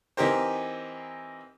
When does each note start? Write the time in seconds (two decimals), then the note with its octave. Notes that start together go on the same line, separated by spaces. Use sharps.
0.17 E3 C4 D#4 G4 A#4 C5